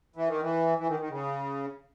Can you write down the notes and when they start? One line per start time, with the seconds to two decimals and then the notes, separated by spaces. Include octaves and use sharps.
0.16 E3
0.28 D#3
0.41 E3
0.78 E3
0.89 D#3
0.99 D#3
1.10 C#3